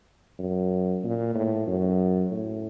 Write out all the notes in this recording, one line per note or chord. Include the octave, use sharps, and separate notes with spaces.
F#2
A#2
A2
F#2
A2